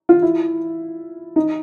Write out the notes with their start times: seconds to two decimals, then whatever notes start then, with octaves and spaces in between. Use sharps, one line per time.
0.09 F4
0.22 E4
1.36 D#4